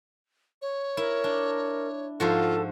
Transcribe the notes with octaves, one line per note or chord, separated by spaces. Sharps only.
C#5
E4 A#4
D4
G#2 F3 F4 F#4 A4